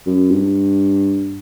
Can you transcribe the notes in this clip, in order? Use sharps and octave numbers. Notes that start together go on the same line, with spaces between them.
F#2
G2